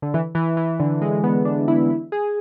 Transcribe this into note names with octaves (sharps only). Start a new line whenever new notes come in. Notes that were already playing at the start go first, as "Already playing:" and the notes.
D3
E3
E3
E3
D3
G#3
B3
D4
E4
E4
G#4